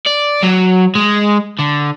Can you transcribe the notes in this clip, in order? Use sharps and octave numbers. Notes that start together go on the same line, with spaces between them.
D5
F#3
G#3
D3